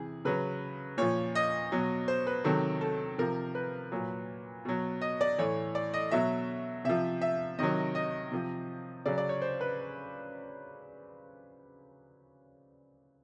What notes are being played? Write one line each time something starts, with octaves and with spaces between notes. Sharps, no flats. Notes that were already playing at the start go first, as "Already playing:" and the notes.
Already playing: C3 E3 G#4
C#3 F#3 B4
A#2 F3 C#5
D#5
B2 F#3
C5
B4
C3 D#3 F#3 A4
A4
C3 F3 A#4
B4
A#2 F#3
B2 F#3
D#5
D5
A2 E3 C#5
D5
D#5
B2 F#3 E5
C3 F3 E5
E5
C3 D#3 F#3 D#5
D#5
C3 F3
C#3 F#3 D5
D5
C#5
C5
B4